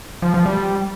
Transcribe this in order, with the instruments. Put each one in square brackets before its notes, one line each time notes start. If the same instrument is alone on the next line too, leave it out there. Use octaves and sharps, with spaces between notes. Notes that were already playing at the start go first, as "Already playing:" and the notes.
[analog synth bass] F3
F3
G3